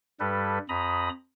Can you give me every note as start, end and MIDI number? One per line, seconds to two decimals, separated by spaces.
0.20 0.59 43
0.20 0.59 55
0.20 0.59 69
0.20 0.59 71
0.69 1.09 41
0.69 1.09 82
0.69 1.09 83
0.69 1.09 87